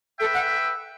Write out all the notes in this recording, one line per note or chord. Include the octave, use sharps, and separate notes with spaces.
A4 B4 E5 G5
F#5